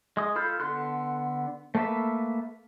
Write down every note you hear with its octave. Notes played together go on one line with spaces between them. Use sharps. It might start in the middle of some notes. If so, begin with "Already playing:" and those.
G#3 D#6
F4 A4 B5 F6 G6
D3 B3 A4 C6 F#6
A3 A#3 A4 B4 E5